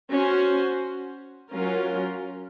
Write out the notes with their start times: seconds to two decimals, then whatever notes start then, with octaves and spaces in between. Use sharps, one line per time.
0.11 C#4 F#4 C5
1.50 F#3 C#4 F4 A#4